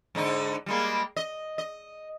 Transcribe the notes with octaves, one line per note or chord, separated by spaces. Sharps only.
G#2 D3 D#4
G3 G#3 A#3
D#5
D#5